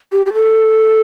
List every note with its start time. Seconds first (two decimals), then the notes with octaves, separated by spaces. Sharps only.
0.12 G4
0.26 G4
0.34 A4